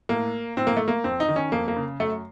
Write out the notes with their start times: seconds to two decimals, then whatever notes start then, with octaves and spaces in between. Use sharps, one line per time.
0.09 A2 A#3
0.57 A2 C4
0.67 A#3
0.77 A3
0.88 A#3
1.04 F2 C4
1.20 D#4
1.29 D#3
1.36 C#4
1.52 F2 A#3
1.68 A#3
1.76 C#3
2.00 F#2 A3